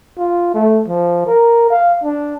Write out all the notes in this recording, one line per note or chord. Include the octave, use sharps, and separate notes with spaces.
F4
A3
F3
A#4
F5
D4